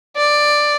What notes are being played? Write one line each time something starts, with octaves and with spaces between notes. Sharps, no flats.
D5